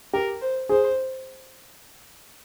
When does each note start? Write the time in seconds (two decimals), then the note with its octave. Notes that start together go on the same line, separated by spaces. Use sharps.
0.13 G4 A#4
0.41 C5
0.69 G#4 C5